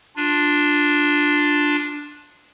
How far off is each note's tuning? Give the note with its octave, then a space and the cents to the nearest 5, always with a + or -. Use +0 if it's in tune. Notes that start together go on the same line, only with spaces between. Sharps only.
D4 +0 F4 +15